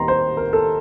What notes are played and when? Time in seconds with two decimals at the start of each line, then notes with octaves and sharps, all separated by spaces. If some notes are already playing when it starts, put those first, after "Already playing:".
Already playing: D#2 D#3 G3 A#5 C6
0.08 C5
0.37 A#4
0.53 A4